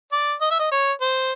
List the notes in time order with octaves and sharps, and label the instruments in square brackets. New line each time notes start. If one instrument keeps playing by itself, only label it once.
[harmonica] D5
D#5
E5
D#5
C#5
C5